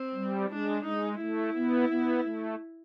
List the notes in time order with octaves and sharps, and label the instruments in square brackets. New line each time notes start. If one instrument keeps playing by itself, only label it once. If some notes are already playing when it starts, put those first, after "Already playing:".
Already playing: [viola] C4
[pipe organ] G3
[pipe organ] G#3 [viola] D4
[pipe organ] G#3 [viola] D#4
[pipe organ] A3 [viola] E4
[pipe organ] B3
B3
A3